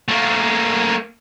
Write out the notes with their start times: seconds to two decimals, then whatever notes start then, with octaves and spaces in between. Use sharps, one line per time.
0.08 A3 A#3